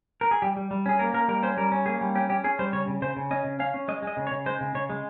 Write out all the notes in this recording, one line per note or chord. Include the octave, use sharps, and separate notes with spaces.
A#4
G#4
G3 G4
G3
G3
C#4 G#4
A#3 A#4
A#3 A#4
G3 A#4
C#4 C5
G3 A#4
C#4
A#3 G#4
G3
C#4 G4
C#4 G4
C#4 G#4
G3 C5
C#3 C#5
C#3
C#3 C5
C#3
C#4 D#5
C#3
C#4 F5
C#4
G#3 D#5
G#3 D#5
C#3
C#5
C#3
G#3 C5
C#3
C#3 C#5
G#3